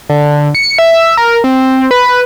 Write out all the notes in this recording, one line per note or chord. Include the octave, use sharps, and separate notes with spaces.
D3
C#7
E5
A#4
C4
B4